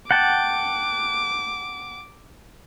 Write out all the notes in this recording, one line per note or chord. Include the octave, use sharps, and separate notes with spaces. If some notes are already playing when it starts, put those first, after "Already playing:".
F#5 G5 A5 D6